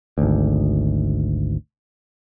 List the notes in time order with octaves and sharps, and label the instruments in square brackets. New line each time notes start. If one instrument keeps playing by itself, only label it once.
[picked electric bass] G#1 D2